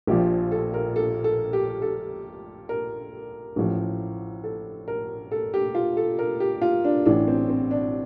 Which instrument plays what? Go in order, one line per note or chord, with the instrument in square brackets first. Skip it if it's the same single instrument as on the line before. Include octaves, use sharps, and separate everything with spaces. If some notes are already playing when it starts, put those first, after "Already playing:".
[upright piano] A#1 A#2 F3 G4
A4
A#4
A4
A4
G4
A4
A#4
A1 A2 F3
A4
A#4
A4
G4
F4
A4
A#4
G4
F4
D4
A1 A2 E3 D4
C4
C4
D4